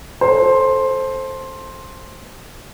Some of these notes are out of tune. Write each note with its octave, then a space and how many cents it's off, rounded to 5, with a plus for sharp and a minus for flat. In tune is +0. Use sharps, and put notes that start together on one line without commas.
A4 -10 C5 +10